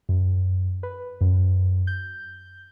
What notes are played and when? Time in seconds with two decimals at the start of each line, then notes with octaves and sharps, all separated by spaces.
0.09 F#2
0.83 B4
1.21 F#2
1.87 G6